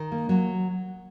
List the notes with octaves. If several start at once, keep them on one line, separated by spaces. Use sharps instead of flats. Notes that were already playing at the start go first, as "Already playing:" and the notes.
Already playing: D#3
A#3
F#3